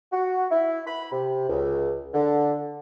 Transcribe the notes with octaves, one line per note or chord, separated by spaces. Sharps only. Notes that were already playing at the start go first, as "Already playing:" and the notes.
F#4
E4
B5
C3
C#2
D3